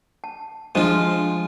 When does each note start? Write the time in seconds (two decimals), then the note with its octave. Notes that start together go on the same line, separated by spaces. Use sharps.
0.24 A5
0.75 F3 G#3 D4 F4 C5 D#5